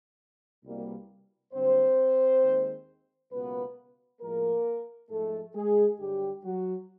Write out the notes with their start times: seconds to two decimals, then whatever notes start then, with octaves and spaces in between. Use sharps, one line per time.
0.64 C2 B2 G3 A#3
1.53 G2 D3 F#3 A#3 C4 C5
2.42 D#2 D#3 G#3
3.32 C#2 B2 F#3 A#3 B3 B4
4.21 A2 F3 G#3 A#3 A#4
5.10 G#2 F3 G#3 A3 A4
5.55 G#3 G#4
5.99 G2 D3 F#3 G3 G4
6.44 F#3 F#4